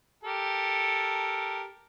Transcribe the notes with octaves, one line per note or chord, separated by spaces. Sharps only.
G4 A4 A#4